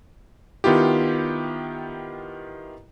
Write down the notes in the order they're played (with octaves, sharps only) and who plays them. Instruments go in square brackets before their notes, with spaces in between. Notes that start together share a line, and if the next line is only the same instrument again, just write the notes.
[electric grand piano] D#3 B3 E4 F4 G4